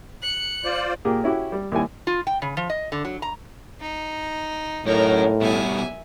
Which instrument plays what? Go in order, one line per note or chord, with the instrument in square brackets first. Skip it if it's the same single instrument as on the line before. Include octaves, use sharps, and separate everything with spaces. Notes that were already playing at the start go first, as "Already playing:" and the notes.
[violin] F#6 C#7
[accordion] F4 C5 D5
[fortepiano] A#2 A#3 G4 G#4
C#4 E4 F#4 G4
G3
D#2 G3 E4 G#5
[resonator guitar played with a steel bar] F4
G5
C#3
F3
D#5
D3
F#3
A#5
[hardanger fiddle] D#4
[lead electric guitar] F#2 [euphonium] A2 [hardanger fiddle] D#4 A#4
[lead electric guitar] B2 G3 [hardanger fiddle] E5 G#5